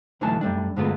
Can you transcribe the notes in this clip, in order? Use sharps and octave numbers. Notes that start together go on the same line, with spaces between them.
B1 D3 E3 F#3 A3 A5
F#2 G3 A3 D4
G2 D3 G#3 A3 B3 F4